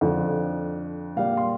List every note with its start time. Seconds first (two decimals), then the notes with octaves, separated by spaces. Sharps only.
0.01 F2 D3 F3
1.16 A#2 G3 F5
1.37 C6